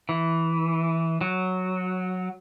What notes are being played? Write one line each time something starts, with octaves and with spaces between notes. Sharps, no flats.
E3
F#3